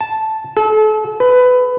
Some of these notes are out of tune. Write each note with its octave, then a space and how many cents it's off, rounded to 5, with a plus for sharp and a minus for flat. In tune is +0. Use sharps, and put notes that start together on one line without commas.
A5 -5
A4 -35
B4 +20